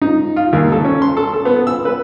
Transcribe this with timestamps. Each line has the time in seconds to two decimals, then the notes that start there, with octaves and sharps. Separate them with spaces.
0.02 D#4
0.36 F4
0.53 D#2
0.72 A4
0.85 C#4
1.02 C6
1.17 A4
1.33 A4
1.45 B3
1.67 E6
1.85 B4